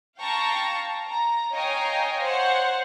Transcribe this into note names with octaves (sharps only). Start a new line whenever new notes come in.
F5 G5 A5 A#5 C#6
A#5
C#5 D#5 F5 G5 G#5 A#5
C5 C#5 F#5